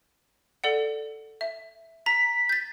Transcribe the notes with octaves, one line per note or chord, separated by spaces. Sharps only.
A4 D5 F#5
E5
A#5 B6
G6 A6